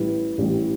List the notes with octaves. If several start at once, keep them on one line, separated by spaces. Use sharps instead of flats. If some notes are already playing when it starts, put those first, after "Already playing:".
Already playing: A1 A2 G3 B4
A1 A2 G3